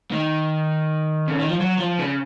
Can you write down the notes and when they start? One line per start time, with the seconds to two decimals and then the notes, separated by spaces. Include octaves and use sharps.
0.11 D#3
1.28 C#3
1.40 D#3
1.50 F3
1.60 F#3
1.79 F3
1.99 C#3